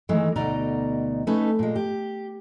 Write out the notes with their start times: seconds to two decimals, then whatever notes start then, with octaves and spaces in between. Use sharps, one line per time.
0.09 D#3 E3 G#3 A3
0.36 D2 B2 D#4 D5 D#5 A#5
1.27 A3 C#4 D#4 B4
1.59 A#2 G#3
1.76 G4